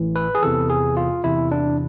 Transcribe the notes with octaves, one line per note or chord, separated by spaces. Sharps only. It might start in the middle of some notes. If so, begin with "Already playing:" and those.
Already playing: A1 A2 E3
B4
G#4
E2 C3 E3 A4
G#4
F4
E2 C3 E3 E4
D4